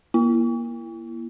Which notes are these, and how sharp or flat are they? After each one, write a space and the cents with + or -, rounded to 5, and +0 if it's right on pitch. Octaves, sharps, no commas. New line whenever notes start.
A#3 +30 E4 +25